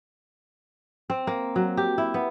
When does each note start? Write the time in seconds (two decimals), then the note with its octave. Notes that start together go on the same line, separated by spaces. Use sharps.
1.10 C4
1.27 A#3
1.56 F#3
1.77 G4
1.98 E4
2.14 B3